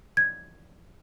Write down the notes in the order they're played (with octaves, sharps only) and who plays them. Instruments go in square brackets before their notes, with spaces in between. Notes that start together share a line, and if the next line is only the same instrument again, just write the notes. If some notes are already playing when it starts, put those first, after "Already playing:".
[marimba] G#6